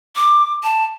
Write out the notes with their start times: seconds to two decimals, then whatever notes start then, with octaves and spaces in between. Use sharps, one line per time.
0.16 D6
0.63 A5